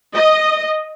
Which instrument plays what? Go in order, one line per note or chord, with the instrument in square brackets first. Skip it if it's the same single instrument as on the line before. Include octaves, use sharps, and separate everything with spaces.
[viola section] D#5